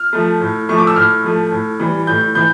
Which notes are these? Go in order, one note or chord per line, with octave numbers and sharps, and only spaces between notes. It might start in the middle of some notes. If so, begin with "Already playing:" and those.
Already playing: F6
F3 A3
A2
F3 A3 C#6
D6
E6
A2 F6
F3 A3
A2
E3 G3
A2 G6
E3 G6